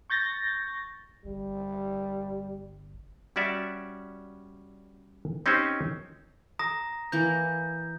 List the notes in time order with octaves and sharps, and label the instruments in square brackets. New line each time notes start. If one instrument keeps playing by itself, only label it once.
[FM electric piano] C#6 G6 A6 A#6
[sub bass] G1 [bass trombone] G3
[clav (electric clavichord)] G3 C#4 F#4 D5 E5
C4 C#4 D#4 G4 C5 D#5
[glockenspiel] A#5 D#6 A#6
[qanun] E3 A#3 A#5 [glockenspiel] G6